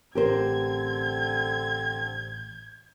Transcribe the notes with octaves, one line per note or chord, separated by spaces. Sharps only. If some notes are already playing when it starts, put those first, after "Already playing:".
A1 D3 C4 G4 A#4 C5 G#6